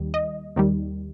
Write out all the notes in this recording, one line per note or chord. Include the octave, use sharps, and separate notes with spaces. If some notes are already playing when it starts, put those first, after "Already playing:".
Already playing: D#2 D#3 G3
D#5
D#2 D#3 G3